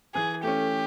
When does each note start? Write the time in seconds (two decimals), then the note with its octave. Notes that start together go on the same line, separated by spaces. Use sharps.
0.14 E3 G#4
0.43 A3 C#4 G4